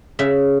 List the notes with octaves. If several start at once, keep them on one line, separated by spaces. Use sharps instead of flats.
C#3 E5